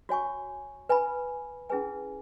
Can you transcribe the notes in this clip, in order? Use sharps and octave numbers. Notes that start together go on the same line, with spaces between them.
F#4 C#5 G#5 C#6
B4 G#5 B5
C#4 E4 G#4 B4 G#5